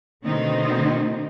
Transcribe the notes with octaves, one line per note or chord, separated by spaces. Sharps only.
B2 D3 D#3 A3 C4 D#4